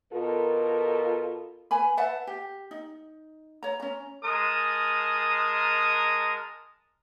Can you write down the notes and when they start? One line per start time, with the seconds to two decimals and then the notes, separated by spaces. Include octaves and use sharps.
0.13 B2 F4 A4 A#4
1.71 B4 G#5 B5
1.97 B4 E5 F#5 A5
2.27 G4
2.71 D#4
3.63 C#5 A#5
3.80 C#4 A#5
4.23 G#3 A#4 A5 D#6